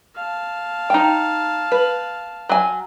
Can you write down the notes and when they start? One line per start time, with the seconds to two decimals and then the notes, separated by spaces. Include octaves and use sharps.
0.15 F5 A5
0.90 D#4 G5
1.72 B4
2.49 F#3 G#5